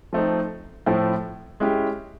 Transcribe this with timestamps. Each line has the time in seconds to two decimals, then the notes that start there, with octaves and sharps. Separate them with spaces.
0.13 F3 A3 C4 D#4
0.86 A2 F3 A3 C4 E4
1.60 G#3 C#4 E4 G4